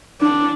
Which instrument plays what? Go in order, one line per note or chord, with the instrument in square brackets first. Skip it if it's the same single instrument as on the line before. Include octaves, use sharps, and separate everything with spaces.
[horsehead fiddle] D4